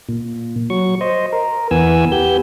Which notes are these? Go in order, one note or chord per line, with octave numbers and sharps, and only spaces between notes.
A#2
F#3 C#6
C5 D#5
A#4
E2 E3 B3 G#5 E6
B3 G4 G6